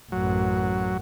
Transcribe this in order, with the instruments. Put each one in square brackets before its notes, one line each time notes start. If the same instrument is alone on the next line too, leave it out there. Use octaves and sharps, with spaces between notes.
[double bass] A1 F#2 [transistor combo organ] F#3